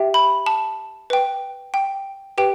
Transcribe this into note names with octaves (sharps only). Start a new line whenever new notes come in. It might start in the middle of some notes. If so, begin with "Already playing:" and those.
Already playing: G4 E5 G5
B5
A5
B4 G5
G5
G4 B4 G5